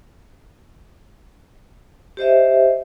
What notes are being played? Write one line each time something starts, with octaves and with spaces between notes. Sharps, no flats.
G4 C5 D#5 E5